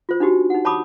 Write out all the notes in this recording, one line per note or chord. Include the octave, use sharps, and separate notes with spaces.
F4 C5
D4 D#4 F#4 G4
D#4 F#5
C#5 A5 B5 D6 D#6